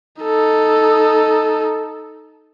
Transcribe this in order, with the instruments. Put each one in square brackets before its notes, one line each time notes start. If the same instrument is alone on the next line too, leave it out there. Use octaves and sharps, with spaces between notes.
[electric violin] D#4 A4